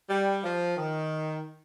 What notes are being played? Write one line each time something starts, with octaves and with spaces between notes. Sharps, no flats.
G3
F3
D#3